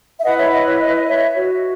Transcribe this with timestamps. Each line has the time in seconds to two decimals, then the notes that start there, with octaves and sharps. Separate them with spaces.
0.19 E5
0.23 E4 B4 D#5 F#5
0.38 C#5 E5
0.52 D#5
0.65 C#5
0.79 D#5
0.96 D#5
1.06 C#5 E5
1.34 F#4 C#5